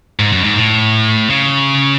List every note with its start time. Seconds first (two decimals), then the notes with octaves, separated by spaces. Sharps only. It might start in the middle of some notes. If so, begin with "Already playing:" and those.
0.19 G#2
0.32 F#2
0.44 G#2
0.56 A2
1.30 C#3